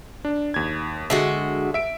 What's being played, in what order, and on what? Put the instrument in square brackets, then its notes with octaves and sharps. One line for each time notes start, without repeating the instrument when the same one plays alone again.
[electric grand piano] D4
D#2 G#6
[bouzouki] D3 G#3 F#4 [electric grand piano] E5
[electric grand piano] E5 D7